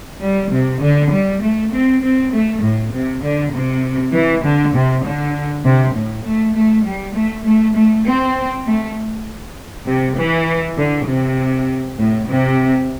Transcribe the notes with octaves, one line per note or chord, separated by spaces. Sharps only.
G3
C3
D3
G3
A3
C4
C4
A3
A2
C3
D3
C3
E3
D3
C3
D3
C3
A2
A3
A3
G3
A3
A3
A3
C4
A3
C3
E3
D3
C3
A2
C3